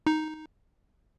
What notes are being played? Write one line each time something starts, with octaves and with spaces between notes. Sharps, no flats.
D#4